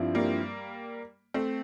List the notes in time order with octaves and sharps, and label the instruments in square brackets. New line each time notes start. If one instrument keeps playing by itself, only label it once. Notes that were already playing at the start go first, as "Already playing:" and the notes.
Already playing: [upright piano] G2 F3 C4 E4
[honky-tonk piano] G3 A#3
A3 C4